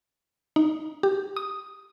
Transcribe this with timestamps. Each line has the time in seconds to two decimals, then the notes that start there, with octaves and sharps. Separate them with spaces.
0.56 D#4
1.03 G4
1.36 D#6